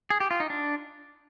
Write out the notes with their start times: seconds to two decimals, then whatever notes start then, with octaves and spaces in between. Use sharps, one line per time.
0.10 G#4
0.20 G4
0.31 F4
0.40 D#4
0.50 D4